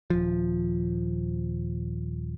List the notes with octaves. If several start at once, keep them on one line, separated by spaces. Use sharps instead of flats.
D#1 F3